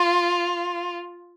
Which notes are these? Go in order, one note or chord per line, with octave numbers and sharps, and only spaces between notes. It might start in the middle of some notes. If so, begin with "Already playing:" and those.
Already playing: F4